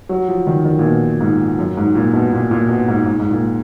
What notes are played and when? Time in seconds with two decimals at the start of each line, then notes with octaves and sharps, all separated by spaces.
0.09 F#3
0.28 F3
0.47 D#3
0.65 D#3
0.79 A#2
0.84 B2
1.21 G#2
1.59 F#2
1.77 G#2
1.95 A#2
2.13 B2
2.33 A#2
2.51 A#2
2.69 B2
2.88 G#2
3.06 G#2
3.20 G#2
3.31 A#2